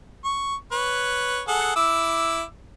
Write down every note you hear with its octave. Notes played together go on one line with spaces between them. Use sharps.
C#6
B4 C#5
G#4 A4 F#5
E4 D6 E6